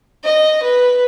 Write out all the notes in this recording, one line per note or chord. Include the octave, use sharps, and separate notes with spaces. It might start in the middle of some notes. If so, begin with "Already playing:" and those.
D#5
B4